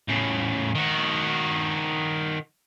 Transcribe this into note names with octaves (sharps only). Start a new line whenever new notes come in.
A2 C#3
D#3 F#4